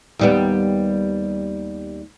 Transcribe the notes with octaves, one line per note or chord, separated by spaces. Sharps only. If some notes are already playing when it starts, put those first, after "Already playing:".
D#2 G3 B3